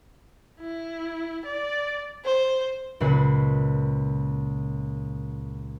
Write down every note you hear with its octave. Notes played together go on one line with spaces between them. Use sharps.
E4
D5
C5
C#2 A#2 C#3 B4 C7